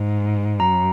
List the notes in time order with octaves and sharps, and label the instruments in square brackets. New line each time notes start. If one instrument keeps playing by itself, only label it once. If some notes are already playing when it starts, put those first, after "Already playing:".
Already playing: [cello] G#2
[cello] F#2 [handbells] A#5